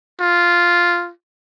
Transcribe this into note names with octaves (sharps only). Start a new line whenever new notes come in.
F4